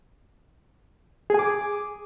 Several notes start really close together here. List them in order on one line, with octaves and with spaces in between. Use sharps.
G#4 G#5 D6